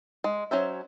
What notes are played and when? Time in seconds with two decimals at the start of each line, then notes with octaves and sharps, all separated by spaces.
0.24 G#3
0.51 F#3 C#4 C5 E5